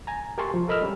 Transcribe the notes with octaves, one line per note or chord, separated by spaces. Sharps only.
G#5 A#5
G4 A#4 G#5 A5 C6 C#6
F3
A4 A#4 D#5 B5 E6 F6
G3 C#4 G4